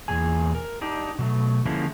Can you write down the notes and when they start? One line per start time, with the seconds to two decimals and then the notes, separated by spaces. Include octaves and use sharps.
0.08 E2 A#2 G#4 G#5
0.55 A#4
0.81 D4 D#4 G4
1.19 B2 F#3 A3
1.65 D3 F3 G#3 A#3 C#4 E4